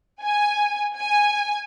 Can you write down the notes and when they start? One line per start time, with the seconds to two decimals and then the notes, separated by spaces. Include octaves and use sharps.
0.23 G#5
0.97 G#5